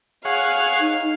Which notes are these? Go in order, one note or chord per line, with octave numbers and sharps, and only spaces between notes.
G#4 C#5 F5 F#5
D#4